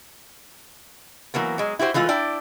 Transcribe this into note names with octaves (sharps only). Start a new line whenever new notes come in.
E3 F#3 A#3 B3
F#3 G#3
E4 F#4 G4 C5
E3 G#3 A3 F4 B4
D4 E4 D5 G5